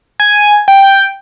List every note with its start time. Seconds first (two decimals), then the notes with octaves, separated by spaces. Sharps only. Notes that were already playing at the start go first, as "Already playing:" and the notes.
0.20 G#5
0.68 G5